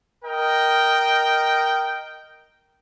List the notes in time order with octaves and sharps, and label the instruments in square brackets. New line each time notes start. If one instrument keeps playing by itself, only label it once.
[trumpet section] A#4 D#5 G5